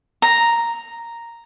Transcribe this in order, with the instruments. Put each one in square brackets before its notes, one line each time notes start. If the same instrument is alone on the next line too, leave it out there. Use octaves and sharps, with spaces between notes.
[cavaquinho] A#5